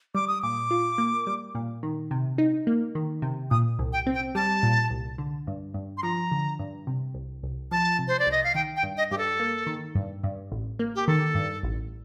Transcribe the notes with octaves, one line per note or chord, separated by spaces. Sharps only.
G3 D6
D#6
A#2 D6
F4
A#3
G3
A#2
D#3
C3
D#4
A#3
D#3
C3
A#2 D#6
C2
G5
C4
G5
G3 A5
A#2
C2
D3
G2
G2
C6
F3 A#5
D3
G2
C3
C2
C2
F3 A5
C3
C5
D5
C2 D#5
F5
D#3 G5
G5
G2
D#5
G2 G4
A4
A#3
D#3
G2
G2
A1
A#3
G4
D#3 A4
G2
A1